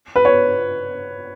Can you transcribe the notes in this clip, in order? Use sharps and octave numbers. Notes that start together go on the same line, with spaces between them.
B4
C#5